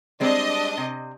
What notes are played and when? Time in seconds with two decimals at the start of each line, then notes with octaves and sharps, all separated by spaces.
0.20 G3 G#3 C4 D4 D#5
0.77 C3